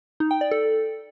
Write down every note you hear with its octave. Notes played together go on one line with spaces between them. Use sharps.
D#4
G5
D5
A4